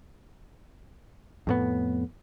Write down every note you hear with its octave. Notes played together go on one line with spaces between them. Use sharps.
F2 A2 B3